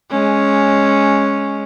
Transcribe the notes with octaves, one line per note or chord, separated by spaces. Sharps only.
G#3 C#4